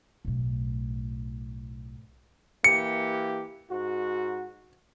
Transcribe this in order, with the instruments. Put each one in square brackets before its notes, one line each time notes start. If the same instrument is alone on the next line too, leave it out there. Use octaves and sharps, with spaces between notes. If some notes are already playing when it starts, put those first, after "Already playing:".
[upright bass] B1 A2
[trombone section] E3 A#3 G4 [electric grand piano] C#7
[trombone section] G#2 F#4